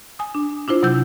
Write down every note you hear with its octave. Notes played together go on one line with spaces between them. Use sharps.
G#5 D#6
D4
D4 E4 F4 C5
C3 F#3 E4 G6